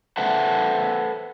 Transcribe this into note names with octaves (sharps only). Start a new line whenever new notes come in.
A4 B4 C5 E5 F#5 A5